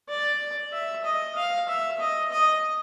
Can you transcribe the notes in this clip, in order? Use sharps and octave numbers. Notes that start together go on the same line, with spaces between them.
D5
E5
D#5
F5
E5
D#5
D#5